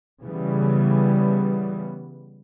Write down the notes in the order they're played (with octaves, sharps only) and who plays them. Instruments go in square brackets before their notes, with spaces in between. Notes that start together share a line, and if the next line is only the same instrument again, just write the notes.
[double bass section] C#3 E3 G3 B3